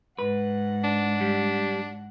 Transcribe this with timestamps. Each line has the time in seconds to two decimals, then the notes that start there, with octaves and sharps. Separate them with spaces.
0.19 G#2 B4 F#5
0.84 D4
1.21 G3